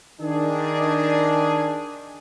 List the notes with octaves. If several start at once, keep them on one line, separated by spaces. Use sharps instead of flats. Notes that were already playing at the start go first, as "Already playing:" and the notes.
D#3 D4 G#4